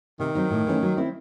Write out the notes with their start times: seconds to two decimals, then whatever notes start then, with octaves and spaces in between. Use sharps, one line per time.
0.20 C3 D#3
0.35 F#3 C4 D#4
0.51 A2
0.66 E3 A3 C#4
0.82 F#3
0.97 C4 E4